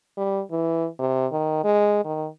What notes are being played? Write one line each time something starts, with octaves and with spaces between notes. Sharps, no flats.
G3
E3
C3
D#3
G#3
D#3